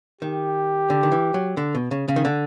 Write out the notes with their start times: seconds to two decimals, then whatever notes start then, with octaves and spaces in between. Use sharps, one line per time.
0.21 D#3 G4
0.90 D3
1.03 D#3
1.12 E3
1.34 F#3
1.57 D3
1.75 B2
1.91 C#3
2.08 C#3
2.16 D#3
2.25 D3